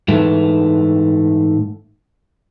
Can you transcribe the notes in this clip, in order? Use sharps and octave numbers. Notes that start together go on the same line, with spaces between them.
G#2 E3 A3